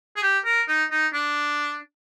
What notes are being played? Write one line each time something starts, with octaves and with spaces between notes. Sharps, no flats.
G#4
G4
A#4
D#4
D#4
D4